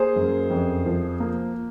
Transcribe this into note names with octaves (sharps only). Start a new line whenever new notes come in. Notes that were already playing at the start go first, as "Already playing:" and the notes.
Already playing: A#3 G#4 C5
F#2
F2
F3
A#3